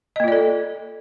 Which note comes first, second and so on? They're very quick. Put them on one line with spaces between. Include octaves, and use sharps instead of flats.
D#5 A#3 F4 D5 A4